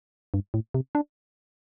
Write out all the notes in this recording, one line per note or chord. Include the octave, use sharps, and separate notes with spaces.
G2
A2
C3
D4